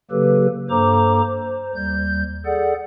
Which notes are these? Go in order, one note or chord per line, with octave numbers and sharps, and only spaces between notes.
C#3 F#3 A#3 G4 A4 B4
G2 A#3 A4 C5 A#5 D6
C5
D#2 G3 G6
G#4 A4 D5 F#5